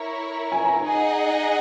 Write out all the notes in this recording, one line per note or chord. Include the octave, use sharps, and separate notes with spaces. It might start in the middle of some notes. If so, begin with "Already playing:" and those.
Already playing: E4 A#4 C#5 A#5
G#5
A#5
G#5
D#4 G#4 D#5 F#5